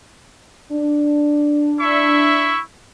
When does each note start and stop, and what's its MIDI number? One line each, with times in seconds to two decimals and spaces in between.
0.72 2.54 62
1.79 2.61 64
1.79 2.61 76
1.79 2.61 85